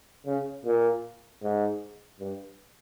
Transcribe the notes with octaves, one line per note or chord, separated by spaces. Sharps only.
C#3
A#2
G#2
G2